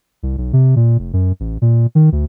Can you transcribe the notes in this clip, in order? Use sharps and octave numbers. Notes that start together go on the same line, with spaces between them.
C2
B1
C3
A#2
F1
F#2
A1
A#2
D#3
D2